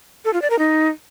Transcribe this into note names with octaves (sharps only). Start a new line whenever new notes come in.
A4
F4
D5
A#4
D#4